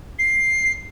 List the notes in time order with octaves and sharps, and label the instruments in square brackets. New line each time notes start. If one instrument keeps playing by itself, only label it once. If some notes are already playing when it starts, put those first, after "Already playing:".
[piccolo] C7